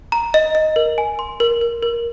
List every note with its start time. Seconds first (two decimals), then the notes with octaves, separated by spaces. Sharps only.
0.12 A#5
0.34 D#5
0.55 D#5
0.76 A#4
0.98 G#5
1.19 C6
1.40 A#4
1.61 A#4
1.83 A#4